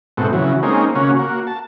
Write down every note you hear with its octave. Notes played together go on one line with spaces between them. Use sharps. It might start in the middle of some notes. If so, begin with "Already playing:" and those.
G#2 B2 A3 C4 F#4
C#3 E3 F#3
G#3 A#3 C4 C#4 D#4
C#3 A#3 C#4 F#4
A#3 F#4
A5